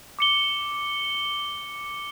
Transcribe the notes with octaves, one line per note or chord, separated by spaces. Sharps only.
D6 C#7 G7